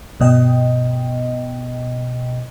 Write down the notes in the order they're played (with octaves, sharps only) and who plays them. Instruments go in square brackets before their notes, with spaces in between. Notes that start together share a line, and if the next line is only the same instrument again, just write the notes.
[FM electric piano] G1 B2 D#5 G5